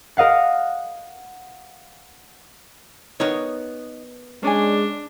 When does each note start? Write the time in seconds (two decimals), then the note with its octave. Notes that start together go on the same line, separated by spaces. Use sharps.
0.17 A#4 D#5 F5 F#5
3.20 B3 D#4 A#4 C#5
4.43 G#3 C#4 D4 D5 G#5